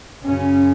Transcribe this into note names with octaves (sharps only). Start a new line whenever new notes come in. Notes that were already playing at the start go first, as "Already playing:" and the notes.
F#2 C#3 C#4